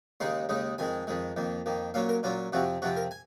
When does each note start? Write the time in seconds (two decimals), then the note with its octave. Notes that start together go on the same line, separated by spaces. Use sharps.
0.20 D#2 C#3 G#3 D#4 C6
0.49 D#2 C#3 G#3 D#4
0.78 F2 D#3 G#3 G#5
1.07 F2 D#3 G#3
1.36 F2 D#3 A#3
1.66 F2 D#3 A#3
1.94 A#2 F#3 A#3 C#4 F5
2.09 A#4
2.23 A#2 F#3 A#3 C#4 F4
2.52 F2 C3 F3 C4 F#4
2.82 F2 C3 F3 C4 F#4
2.97 A#4
3.11 G#5